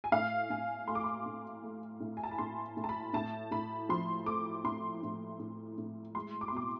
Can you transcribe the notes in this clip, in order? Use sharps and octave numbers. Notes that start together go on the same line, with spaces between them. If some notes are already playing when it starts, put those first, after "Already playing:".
G#5
A2 F5
A2 G#5
A3 C6
D6
C6
A2
A3
A2
G#5
A5
B5
A2 C6
A2
A5
B5
A2 A5
A2 B5
F3 C6
A3 D6
A2 C6
A2
A2
A2
G#3 C6
D6
C6
B2 D6